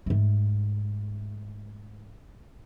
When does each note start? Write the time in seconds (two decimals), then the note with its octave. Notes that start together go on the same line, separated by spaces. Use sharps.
0.06 G#2 A3